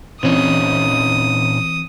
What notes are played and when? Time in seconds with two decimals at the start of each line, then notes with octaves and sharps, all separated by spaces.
0.23 A#2 E3 C4 C#4 D#4 D#6